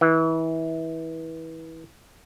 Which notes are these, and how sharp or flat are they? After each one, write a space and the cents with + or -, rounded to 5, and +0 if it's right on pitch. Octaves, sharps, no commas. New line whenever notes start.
E3 -25